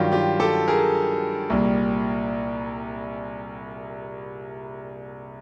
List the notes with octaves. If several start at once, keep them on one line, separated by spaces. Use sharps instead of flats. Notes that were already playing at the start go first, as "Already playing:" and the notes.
Already playing: G2 D#3 F#3 F4 G4
F4 G4
G4 A4
G#4 A#4
C2 A#2 G3